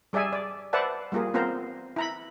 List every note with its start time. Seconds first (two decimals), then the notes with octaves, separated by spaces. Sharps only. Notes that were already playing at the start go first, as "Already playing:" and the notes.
0.13 G3 G#4 D5 E5 G#5
0.33 D5
0.73 B4 C5 D5 E5 F#5 A5
1.12 G3 A#3 F4 G#4 A#4
1.34 B3 C4 F4 A#4 C5 A#5
1.96 E4 A#5 B5